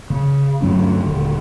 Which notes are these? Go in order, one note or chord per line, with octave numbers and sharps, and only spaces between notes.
C#3
D2 G2 F#3 C#4
D#1 D3